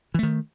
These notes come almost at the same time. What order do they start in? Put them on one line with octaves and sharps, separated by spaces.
E3 A3 D#3